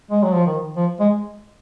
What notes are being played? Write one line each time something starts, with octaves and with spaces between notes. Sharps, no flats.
G#3
F#3
F3
D#3
F3
G#3